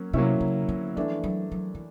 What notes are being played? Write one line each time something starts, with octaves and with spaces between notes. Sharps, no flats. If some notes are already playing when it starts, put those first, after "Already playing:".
Already playing: F#3 A#3 C#4
C3 F#3 A#3 C#4 E4
C#3
D3
E3 F3 A3 D4
F#3
F#3
E3